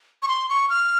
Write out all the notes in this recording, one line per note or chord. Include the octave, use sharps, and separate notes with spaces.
C#6
C6
C#6
F6